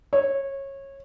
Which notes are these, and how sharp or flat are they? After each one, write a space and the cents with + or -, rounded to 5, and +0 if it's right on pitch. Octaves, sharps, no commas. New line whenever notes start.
C#5 -20